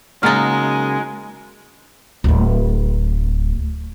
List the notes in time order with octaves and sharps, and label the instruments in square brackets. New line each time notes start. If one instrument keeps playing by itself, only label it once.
[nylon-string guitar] C#3 A#3 [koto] F#3 D#4 [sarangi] G#3 [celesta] F6 A6
[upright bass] D1 A3